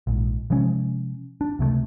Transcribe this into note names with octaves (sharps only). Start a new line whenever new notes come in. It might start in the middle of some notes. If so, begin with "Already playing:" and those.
A#1 G#2
C3 F3 G#3 C#4
D4
C#2 C3 F#3 A3